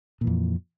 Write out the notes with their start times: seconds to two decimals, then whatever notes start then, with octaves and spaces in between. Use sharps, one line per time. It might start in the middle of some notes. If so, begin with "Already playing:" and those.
0.21 A#2
0.24 E3
0.27 F2